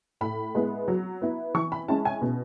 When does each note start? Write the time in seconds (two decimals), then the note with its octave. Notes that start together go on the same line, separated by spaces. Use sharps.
0.21 A2 B5
0.55 G#3 B3 E4
0.88 F#3
1.21 B3 E4
1.54 E3 C#6
1.72 B5
1.88 G#3 C#4 E4 A5
2.05 G#5
2.22 B2